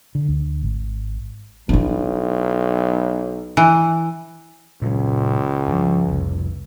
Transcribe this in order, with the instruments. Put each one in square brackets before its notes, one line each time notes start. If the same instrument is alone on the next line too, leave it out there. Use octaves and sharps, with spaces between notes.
[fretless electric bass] D3
D2
G#1
[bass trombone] B1 [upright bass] D4 E4
[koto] E3
[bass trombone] C#2 [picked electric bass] A#2 F#3 G#3
[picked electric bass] G2 F3
F1 C2